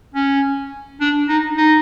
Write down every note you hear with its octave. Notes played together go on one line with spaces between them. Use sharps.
C#4
D4
D#4
D#4